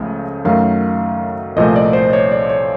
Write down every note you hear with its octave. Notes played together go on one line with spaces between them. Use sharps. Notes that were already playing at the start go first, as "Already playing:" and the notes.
Already playing: C#2 C#3 F3 A3
F#2 D#3 F#3 A3 F5
C2 A#2 F3 A3 D#5
D5
C5
C#5
D5
C#5